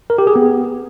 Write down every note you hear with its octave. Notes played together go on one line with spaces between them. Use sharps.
A#4
G4
G#4
B3